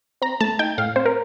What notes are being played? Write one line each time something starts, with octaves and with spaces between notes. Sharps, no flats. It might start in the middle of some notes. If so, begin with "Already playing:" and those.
C4 A#5
A3 A5
D#4 G5
A2 F5
C4 C5
A#4